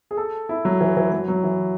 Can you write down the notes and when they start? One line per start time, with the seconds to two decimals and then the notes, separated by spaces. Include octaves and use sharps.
0.11 G#4
0.17 A4
0.49 E4
0.65 F#3
0.81 E3
0.97 E3
1.12 F#3
1.28 F#3
1.43 E3